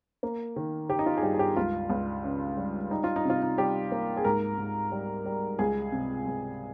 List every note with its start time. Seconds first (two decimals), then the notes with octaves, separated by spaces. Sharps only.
0.23 A#3
0.56 D#3
0.89 D#3 G4
0.99 D#4
1.06 F4
1.17 G#4
1.22 G2 G4
1.34 G#4
1.39 G4
1.56 C#2 F4
1.90 C#2
2.24 C#3
2.57 G3
2.90 G3 D#4
3.04 F4
3.16 D#4
3.25 C3 F4
3.42 D#4
3.58 G3 G4
3.92 A#3
4.17 G#4
4.24 G#2 A#4
4.58 G#2
4.92 G3
5.26 G3
5.59 C#2 G#4
5.92 C3
6.27 C#2